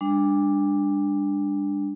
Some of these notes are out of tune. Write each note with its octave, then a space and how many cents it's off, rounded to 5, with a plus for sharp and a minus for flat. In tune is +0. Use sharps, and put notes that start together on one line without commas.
G3 +45 D4 +0